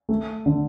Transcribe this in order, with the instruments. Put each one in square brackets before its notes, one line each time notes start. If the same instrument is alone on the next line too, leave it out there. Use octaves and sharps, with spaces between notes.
[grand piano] A3
D3